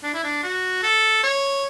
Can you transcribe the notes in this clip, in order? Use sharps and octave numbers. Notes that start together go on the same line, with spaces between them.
D4
E4
D4
F#4
A4
C#5